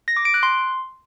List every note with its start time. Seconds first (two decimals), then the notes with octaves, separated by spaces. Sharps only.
0.08 A#6
0.17 D6
0.25 D7
0.34 F#6
0.43 C6